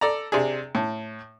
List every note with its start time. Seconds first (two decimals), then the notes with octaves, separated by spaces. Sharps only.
0.01 A4 D5 A#5
0.32 C3 D4 G#4
0.75 A2